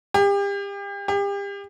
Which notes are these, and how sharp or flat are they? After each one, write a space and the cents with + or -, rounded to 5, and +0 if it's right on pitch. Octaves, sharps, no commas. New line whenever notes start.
G4 +35
G4 +35